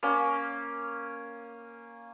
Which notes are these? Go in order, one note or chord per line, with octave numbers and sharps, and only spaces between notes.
A#3 C#4